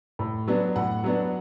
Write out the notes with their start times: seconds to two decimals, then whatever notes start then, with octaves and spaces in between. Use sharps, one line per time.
0.19 A2
0.47 F#3 B3 D4
0.76 A2 F#5
1.04 F#3 B3 D4